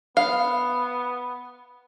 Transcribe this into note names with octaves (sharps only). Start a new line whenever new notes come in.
B3 F5